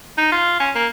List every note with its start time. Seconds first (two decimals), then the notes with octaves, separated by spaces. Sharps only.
0.17 D#4
0.32 F4
0.60 C#4
0.75 A#3